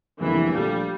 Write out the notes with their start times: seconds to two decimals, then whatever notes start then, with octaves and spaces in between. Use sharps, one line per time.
0.19 F1 E2 D3 E3 G3 A#3
0.52 A#1 A#2 G3 A3 D4 A4